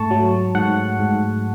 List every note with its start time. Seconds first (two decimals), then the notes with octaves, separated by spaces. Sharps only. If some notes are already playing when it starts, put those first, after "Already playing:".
Already playing: G#2 A3 A5 C#6
0.11 F#3
0.55 G#2 F#5
0.99 G#2